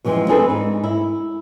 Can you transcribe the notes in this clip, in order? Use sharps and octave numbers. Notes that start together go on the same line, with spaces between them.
F#2 E3 F3 G#3 C4
C4 D4 G#4 A4 B4
G#2 D#4
E4